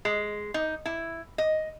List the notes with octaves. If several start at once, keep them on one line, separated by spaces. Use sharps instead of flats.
G#3
D#4
E4
D#5